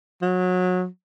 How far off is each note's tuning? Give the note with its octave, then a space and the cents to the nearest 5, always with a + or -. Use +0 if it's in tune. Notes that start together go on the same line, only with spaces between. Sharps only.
F#3 -25